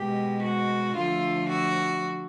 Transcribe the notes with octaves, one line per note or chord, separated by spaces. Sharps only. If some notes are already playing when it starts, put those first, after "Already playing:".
Already playing: B2 G#3 G4
F#4
D3 F3 A3 F4
F#4